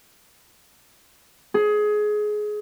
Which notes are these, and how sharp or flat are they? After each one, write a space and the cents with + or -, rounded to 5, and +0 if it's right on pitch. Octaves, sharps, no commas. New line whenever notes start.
G#4 +20